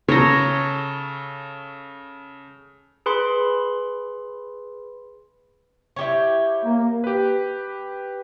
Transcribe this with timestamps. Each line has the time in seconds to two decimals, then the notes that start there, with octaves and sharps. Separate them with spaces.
0.08 C#3 A4 C#5 A#5
3.06 G#4 B4 B5 C6
5.96 E4 G4 C#5
6.64 A#3
7.04 G4 B4